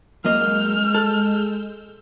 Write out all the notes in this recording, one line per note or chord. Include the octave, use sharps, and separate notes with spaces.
F#2 G#3 A#3 D#5 E6 F6 G6
A4